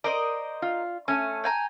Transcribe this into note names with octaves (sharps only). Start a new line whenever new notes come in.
A#4 C5 D5 D#5
F4
A3 C#4 G#5
G5 G#5 A#5